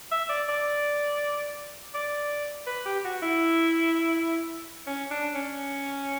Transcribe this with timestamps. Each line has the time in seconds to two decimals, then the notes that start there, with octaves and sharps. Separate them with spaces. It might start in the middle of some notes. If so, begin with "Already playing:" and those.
0.12 E5
0.29 D5
0.49 D5
1.95 D5
2.67 B4
2.85 G4
3.04 F#4
3.23 E4
4.87 C#4
5.11 D4
5.35 C#4